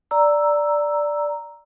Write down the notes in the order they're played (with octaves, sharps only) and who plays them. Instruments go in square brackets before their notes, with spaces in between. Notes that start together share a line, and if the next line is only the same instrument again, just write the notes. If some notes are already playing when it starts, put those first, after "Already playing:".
[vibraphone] D5 A#5 E6